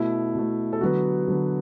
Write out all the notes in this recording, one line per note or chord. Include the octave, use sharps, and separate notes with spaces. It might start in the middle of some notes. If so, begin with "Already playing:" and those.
Already playing: B2 A3 E4
B2 A3
A4
D3 F#3 B3 F#4
D3 F#3 B3